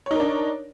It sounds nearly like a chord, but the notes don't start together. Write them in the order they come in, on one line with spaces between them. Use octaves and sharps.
C#5 D#4 A#4 D4